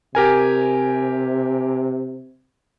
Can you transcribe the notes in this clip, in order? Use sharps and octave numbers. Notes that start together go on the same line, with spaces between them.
C3 G4 A#4 G#5